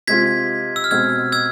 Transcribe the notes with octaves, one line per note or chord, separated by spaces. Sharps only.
C3 G#3 C4 F4 G#6 B6
E6
F6
B2 G#3 C4 E6 G#6
E6 G#6